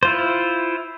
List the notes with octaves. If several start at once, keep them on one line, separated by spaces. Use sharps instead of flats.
E4 F4 C5